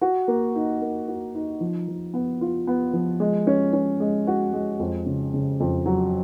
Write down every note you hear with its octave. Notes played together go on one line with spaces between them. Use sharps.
F#4
A#3
D#4
A#3
F#4
D#4
F3
F3
B3
F4
B3
F3
G#3
C#4
C#4
G#3
F#4
G#3
F2
C#3
C#3
F2
F#3